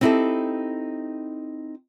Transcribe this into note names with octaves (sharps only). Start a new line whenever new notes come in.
C4 D#4 E4 F#4 G4 A4